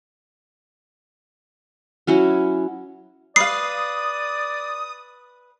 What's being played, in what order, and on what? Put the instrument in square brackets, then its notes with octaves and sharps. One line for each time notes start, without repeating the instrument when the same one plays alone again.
[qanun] F#3 C#4 E4 F#4
[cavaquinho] B4 F5 [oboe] D5 [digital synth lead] D#6 [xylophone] C7